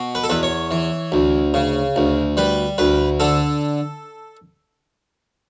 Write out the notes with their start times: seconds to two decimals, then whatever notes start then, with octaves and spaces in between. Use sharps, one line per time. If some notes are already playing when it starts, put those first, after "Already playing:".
Already playing: B2
0.15 B4
0.24 A4
0.30 E2 B4
0.43 C#5
0.71 E3
1.12 D2
1.54 C#3
1.96 D2
2.37 G3 B4
2.78 D2 B4
3.20 D3 A4